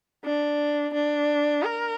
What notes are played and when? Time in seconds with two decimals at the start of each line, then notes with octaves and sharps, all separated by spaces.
0.25 D4
0.94 D4
1.64 A#4